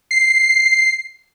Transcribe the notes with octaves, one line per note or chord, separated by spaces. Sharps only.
C7